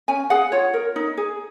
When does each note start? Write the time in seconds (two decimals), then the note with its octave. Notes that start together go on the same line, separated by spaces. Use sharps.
0.08 C#4 G#5
0.30 G#4 F#5
0.52 F4 C#5
0.74 A#4
0.96 D#4
1.17 G#4